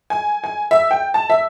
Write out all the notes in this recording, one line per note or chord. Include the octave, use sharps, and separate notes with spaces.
G#5
G#5
E5
G5
A5
E5